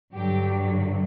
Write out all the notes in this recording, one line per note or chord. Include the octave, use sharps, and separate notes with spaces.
G2 D3 F#3 G4